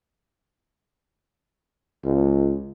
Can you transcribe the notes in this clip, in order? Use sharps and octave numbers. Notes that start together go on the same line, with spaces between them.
C#2